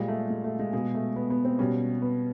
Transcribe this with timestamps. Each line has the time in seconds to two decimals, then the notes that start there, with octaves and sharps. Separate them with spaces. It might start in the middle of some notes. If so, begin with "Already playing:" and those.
Already playing: A#2 G3 G#3
0.08 A3
0.30 G#3
0.44 A3
0.59 G#3
0.73 B2 G#3
0.94 A3
1.16 B3
1.30 B3
1.45 C4
1.58 B2 G3 C#4
2.02 B3